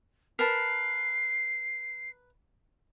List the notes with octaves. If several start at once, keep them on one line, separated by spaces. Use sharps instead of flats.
A#4 B4 A5 C7